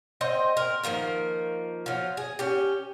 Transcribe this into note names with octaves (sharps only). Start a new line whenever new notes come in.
C4 D#5 G5
A#4
D#3 F3 A#3 A#4
F3 F#3
G#4
C#4 G4